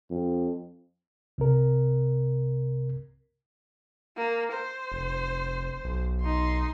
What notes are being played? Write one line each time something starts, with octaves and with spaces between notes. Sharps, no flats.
F2
C2 C3 A#4
A#3
C5
F1
B1
D#4 C6